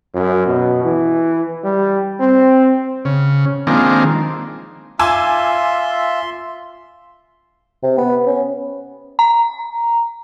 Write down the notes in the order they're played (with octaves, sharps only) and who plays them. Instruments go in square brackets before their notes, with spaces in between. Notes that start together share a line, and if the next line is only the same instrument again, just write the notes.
[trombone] F#2
B2
E3
G3
C4
[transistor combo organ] C#3
D#3 F3 G#3 A#3 C4 D4
[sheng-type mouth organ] F4 E5 [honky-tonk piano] G#5 D6 E6 [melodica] C6
[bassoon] C3
B3
C#4
[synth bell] A#5